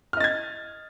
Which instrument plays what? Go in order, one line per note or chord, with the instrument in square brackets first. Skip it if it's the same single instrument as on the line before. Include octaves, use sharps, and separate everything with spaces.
[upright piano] F6
D#5
A6
G#6